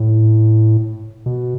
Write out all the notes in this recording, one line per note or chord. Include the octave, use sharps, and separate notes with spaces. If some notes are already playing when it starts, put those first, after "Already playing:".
Already playing: A2
B2